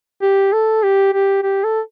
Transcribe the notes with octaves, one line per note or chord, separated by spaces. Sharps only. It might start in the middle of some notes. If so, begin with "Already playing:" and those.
G4
A4
G4
G4
G4
A4